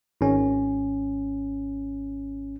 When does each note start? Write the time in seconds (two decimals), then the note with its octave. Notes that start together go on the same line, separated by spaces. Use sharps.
0.21 G#1 C#4